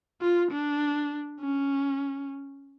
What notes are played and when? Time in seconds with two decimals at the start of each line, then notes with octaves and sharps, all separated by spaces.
0.21 F4
0.51 D4
1.41 C#4